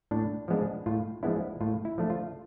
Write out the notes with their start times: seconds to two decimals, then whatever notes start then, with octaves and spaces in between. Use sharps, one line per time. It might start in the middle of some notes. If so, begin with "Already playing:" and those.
0.11 A2 D4
0.48 F3 G#3 B3 D4
0.86 A2 F4
1.23 F3 G#3 B3 D4 E4
1.61 A2 F4
1.85 E4
1.98 F3 A3 D4
2.10 F4